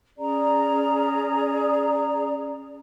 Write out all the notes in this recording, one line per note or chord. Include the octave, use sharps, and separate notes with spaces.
C#4 G#4 D5 A#5